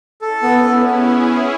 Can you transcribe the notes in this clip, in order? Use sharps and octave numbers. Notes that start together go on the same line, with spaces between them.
C#4 E4 A4
B3
C#4 E4
B3
B3 E4 G#4